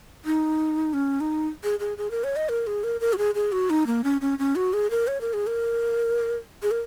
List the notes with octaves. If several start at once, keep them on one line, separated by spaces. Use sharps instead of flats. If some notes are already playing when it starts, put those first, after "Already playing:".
D#4
C#4
D#4
G#4
G#4
G#4
A#4
C#5
D#5
A#4
G#4
A#4
A#4
F#4
G#4
G#4
F#4
D#4
A#3
C#4
C#4
C#4
F#4
G#4
A#4
C#5
A#4
G#4
A#4
G#4
A#4